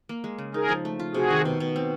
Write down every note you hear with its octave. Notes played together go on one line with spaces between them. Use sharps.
A#3
G#3
C#3
D#4 G#4 A#4
F3
A3
F4
C3 F#4 G#4
D#3
B2
B2
C4